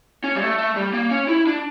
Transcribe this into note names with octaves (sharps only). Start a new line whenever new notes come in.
C#4
G3
A3
A3
G3
A#3
C#4
E4
D4